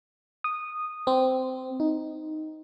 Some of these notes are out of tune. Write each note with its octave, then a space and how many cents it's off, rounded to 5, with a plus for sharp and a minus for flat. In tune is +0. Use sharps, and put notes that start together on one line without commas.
D#6 -10
C4 -15
D#4 +5